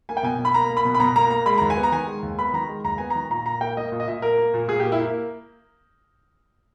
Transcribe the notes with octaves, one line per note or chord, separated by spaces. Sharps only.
A#3 G#5
G5
B2 G#5
B2
B5
A#3 A#5
A#3
B5
B2
B5
B2 A#5
A#3 A#5
A#3 A#5
G#3 B5
A#5
D#2
G#5
B3
A#5
D#3 G#5
G#3
D#2
B3 B5
D#3 A#5
G#3
D#2 A#5
B3 G#5
D#3 A#5
A#2 A#5
A#2 A#5
A#3 G5
A#3 D#5
A#2
D#5
A#2 E5
A#3 A#4
A#3
A#2
A#2 G#4
G4
A#3
E4
A#3